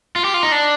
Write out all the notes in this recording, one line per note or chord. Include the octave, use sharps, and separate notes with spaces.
F4
G4
F4
D#4
D4